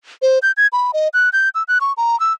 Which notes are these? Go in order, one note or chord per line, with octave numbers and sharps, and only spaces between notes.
C5
G6
G#6
B5
D#5
F#6
G6
E6
F#6
C#6
A#5
E6